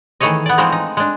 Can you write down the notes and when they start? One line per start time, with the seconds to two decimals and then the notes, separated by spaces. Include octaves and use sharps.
0.20 D#3 E3 A3 G#4 C#5 D#5
0.46 B3 D5
0.58 E3 F3 G#3 A3 C4 D#4
0.72 D#4
0.97 G#3 D4